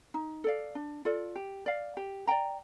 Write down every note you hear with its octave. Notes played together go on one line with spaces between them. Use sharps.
D#4
A4 D5 F5
D4
F4 A4 D5
G4
D5 F5
G4
D5 G5 A#5